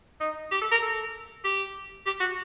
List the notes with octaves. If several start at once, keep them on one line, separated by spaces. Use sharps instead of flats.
D#4
G4
A4
A#4
A4
G4
G4
F#4